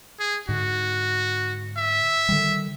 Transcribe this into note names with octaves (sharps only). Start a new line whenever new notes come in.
G#4
G#2 D3 F#4
E5
D3 D#3 G3